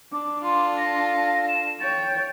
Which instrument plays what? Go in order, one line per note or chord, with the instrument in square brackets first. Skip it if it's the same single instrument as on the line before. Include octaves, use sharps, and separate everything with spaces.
[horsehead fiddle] D4 [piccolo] D6
[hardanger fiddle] F4 A4 [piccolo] C6
[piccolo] A#6
E7
[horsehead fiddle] C#5 G5 [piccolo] A6